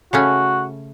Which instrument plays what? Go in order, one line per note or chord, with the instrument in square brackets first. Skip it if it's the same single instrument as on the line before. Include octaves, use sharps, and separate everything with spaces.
[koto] C#3 A3 C#4 [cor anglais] F#4